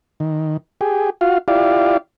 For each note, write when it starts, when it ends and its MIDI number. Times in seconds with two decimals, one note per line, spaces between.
0.20 0.57 51
0.81 1.10 67
0.81 1.10 68
1.21 1.38 65
1.21 1.38 66
1.21 1.38 77
1.48 1.97 64
1.48 1.97 65
1.48 1.97 67
1.48 1.97 74
1.48 1.97 77